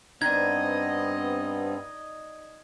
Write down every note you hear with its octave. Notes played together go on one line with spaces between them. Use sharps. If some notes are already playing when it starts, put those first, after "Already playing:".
G2 B3 C4 D#4 D5 D#5 G#6